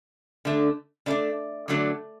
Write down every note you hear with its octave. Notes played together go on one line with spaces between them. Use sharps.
D3 A3 D4
D3 A3 D4 D5
D3 F#3 A3 D4